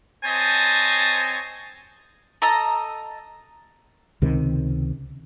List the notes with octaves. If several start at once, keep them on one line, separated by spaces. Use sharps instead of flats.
C4 C5 C#5 D#5 G#5 A5
A4 D#5 A#5
C#2 C3 D#3